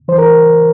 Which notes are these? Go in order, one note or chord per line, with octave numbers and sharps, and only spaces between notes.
E3 C5
A#4